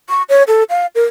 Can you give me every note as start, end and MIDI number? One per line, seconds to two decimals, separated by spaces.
0.09 0.23 85
0.29 0.43 73
0.48 0.63 69
0.70 0.86 77
0.95 1.03 70